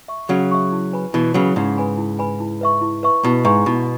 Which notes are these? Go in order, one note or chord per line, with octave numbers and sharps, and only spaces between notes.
E5 C#6
C#3 F#3 F#4
E5 C#6
E4
B4 G#5 B5
B2 E3 E4
C#3 F#3 B4 G#5 B5
G#2 C#3 E4
B4 G#5 B5
E4
B4 G#5 B5
E4
B4 E5 C#6
E4
B4 E5 C#6
B2 E4
G#2 B4 E5 C#6
B2 E4